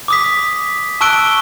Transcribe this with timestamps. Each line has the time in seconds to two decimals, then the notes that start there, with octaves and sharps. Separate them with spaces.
0.08 D6 D#6 B6
1.01 A5 C#6 E6 F#6 D7 G7